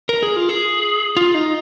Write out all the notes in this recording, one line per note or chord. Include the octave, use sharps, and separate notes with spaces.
A#4
G#4
F4
G#4
F4
D#4